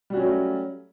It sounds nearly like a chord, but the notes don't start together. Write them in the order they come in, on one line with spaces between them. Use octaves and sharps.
G3 F#4 C#4 F#3 A3